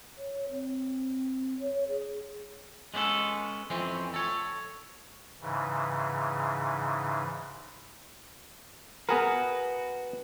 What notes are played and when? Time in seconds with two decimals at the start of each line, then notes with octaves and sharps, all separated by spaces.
0.18 C#5
0.51 C4
1.60 C#5
1.89 G#4
2.94 G#3 B3 C#4 G4 A4
3.70 F2 E3 C4 C#4
4.14 A4 C#5
5.41 G#2 C#3 E3
9.09 B3 F#4 G#4 A#4 B4